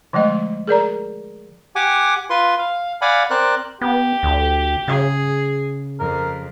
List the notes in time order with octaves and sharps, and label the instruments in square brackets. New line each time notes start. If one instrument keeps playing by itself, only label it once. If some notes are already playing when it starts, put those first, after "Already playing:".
[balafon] D3 F3 G#3 A3 D#5
G#4 A#4 D5 A#5
[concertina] G4 F#5 G#5 D6
F4 B4 C6
F5
D5 F5 F#5 G#5 B5
C4 A#4 C5 D5 F#6
[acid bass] B3 [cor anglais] G4
[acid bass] D2
[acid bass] C#3 [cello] G#4
[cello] F2 [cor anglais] A#4